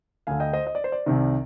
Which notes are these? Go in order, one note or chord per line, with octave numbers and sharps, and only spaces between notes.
D2 D3 F5 G#5
D#5 G5
C5 D#5
D#5
D5
C5
D5
C2 C3 D#3